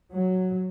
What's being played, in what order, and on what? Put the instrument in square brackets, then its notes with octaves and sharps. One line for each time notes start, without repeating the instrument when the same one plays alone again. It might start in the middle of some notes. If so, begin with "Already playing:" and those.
[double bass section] F#3